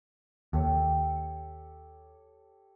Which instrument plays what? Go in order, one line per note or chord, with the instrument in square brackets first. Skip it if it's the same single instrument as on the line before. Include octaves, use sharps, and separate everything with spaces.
[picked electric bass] D#2 [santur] G4 A4 C#5